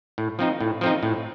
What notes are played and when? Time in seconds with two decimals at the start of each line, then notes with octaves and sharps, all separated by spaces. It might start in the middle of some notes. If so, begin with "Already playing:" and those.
0.18 A2
0.39 F3 C4 D#4
0.61 A2
0.81 F3 C4 D#4
1.03 A2